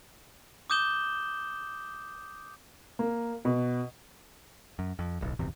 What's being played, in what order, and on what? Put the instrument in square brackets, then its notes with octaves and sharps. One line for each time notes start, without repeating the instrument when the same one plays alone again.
[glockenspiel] D6 D#6 G6 E7 G7
[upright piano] A#3
B2
[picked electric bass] F#2
F2
D1 B1
D1 G#1 E2 C3